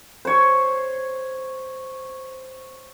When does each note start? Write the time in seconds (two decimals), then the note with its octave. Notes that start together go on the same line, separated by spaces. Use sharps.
0.25 C5 C#5